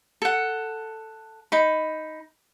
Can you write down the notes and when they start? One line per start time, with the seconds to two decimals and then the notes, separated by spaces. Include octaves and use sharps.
0.22 A4 F#5
1.52 D#4 B5